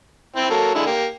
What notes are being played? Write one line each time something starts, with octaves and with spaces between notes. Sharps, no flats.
C4 E4 C5
F#3 A#3 A4
D3 G#3 E4
A#3 G4